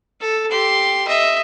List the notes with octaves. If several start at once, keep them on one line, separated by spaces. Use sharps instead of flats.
A4
G4 C6
D#5 E5